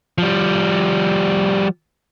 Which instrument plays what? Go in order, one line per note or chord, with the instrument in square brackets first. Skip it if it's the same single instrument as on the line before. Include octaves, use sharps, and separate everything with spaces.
[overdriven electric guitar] F3 G3